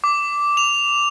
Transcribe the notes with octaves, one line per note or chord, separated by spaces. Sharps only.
D6
F7